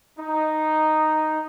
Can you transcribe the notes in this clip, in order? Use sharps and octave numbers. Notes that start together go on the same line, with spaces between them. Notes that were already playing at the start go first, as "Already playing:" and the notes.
D#4